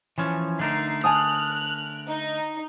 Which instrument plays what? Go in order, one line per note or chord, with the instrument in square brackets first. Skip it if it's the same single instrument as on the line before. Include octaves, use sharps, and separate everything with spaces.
[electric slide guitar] E3 F3 C#4
[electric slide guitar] D3 A3 A#4 [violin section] D#4 C7
[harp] G#5 A5 D#6 [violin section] F6 F#6
[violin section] D#4